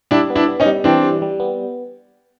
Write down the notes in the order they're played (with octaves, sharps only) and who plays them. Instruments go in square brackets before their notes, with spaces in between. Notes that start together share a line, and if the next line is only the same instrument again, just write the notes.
[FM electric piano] G3 [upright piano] D4 E4
[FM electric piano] B3
[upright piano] D4 E4
[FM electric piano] B3
[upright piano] C#4 D#4
[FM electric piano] G3
[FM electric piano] E3 [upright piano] C4 D4
[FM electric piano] G3
G3
B3